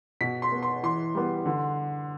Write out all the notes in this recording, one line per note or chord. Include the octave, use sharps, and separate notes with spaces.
B2 B6
C6
B3
C6
E3 C6
G3 B3
D3